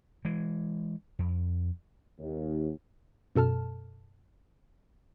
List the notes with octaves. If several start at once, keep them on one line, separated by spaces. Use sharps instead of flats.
E3 G#3
F2
D#2
F#2 B2 A4 A5 F6